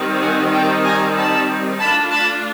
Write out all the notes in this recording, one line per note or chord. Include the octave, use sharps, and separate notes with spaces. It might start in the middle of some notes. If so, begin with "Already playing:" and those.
Already playing: D#3 G3 C4 D#4
F#5 G#5
G5 A5
G#5 A#5
A5 B5
A3 D4 F4 A5 B5
A5 B5